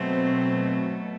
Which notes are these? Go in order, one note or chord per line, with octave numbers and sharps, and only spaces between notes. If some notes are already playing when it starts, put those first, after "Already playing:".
Already playing: B2 F#3 A3 C4